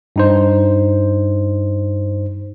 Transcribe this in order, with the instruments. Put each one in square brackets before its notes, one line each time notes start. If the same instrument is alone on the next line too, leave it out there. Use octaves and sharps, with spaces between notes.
[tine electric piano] G2 D#4 C5